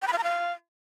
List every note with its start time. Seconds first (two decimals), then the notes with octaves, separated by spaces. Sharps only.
0.02 G5
0.07 B5
0.13 F5
0.18 A#5
0.23 F5